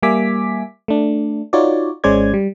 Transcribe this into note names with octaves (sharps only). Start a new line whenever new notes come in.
G3 A#3 E5 G#5 D6 B6
A3 D4
D#4 F4 F#4 C#5 D5
G#1 G#3 C#4 C5 D5 G#6
G3